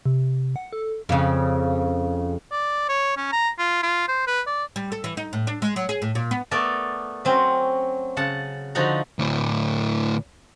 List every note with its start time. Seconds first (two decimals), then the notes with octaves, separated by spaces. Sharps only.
0.06 C3
0.56 F#5
0.73 A4
1.09 F2 C#3
2.52 D5
2.89 C#5
3.17 C#4
3.32 A#5
3.58 F4
3.83 F4
4.08 C5
4.27 B4
4.47 D5
4.76 G3
4.92 A4
5.04 E3
5.17 D#4
5.33 A2
5.47 D4
5.62 G#3
5.76 F#3
5.89 G#4
6.02 A2
6.15 A#2
6.31 B3
6.51 A3 B3 A#4 D5 A5
7.25 F#3 C4 C#4
8.17 C#3 F#5 A5
8.75 D3 F3 D#4 F#4 F#5 A#5
9.19 D2 A2